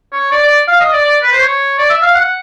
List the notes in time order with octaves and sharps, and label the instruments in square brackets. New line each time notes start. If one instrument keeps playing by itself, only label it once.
[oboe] C#5
D5
D5
F5
D#5
D5
D5
B4
C5
C#5
D5
E5
F5
F#5